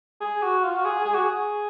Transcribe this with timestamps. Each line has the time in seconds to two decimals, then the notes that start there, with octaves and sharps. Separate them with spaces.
0.21 G#4
0.42 F#4
0.64 F4
0.77 F#4
0.85 G#4
1.05 G#4
1.14 F#4
1.24 G#4